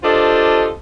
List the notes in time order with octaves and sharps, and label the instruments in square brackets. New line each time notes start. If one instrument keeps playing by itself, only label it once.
[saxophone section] D4 F4 G4 A4 C5 D#5